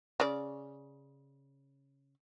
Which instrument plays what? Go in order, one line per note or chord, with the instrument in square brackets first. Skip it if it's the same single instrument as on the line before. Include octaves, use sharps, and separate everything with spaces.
[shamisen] C#3 D5